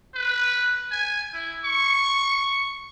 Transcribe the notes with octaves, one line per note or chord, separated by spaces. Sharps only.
B4
G#5
E4
C#6